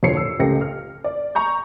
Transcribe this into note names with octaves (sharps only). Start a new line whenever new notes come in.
F1 D2 F3 C#5 C7 C#7
E6
C#2 A3 G4 A#6 C#7
F6
D5
A#5 C#6 G6